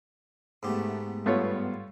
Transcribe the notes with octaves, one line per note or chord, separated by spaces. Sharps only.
G#2 A3 B3 G4
G2 A3 B3 F4 C#5